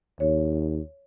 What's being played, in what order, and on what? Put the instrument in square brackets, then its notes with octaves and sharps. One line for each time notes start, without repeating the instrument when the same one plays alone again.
[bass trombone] D#2 [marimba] C#5